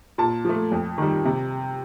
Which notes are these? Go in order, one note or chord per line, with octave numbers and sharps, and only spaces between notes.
A#2 A5
F3 A3
F2
D#3 G3
C3